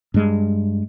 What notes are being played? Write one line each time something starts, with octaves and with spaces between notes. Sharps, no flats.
G2 G#3